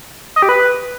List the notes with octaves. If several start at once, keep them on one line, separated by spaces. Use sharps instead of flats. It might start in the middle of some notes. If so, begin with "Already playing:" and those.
D#5
G4
B4